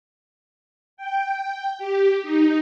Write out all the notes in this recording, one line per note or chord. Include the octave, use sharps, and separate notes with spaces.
G5
G4
D#4